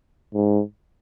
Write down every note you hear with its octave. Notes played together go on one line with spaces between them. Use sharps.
G#2